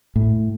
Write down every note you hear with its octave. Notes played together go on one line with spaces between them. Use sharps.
A2